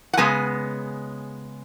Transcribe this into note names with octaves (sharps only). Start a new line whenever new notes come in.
F#5
C#3 G#3 B3 G#5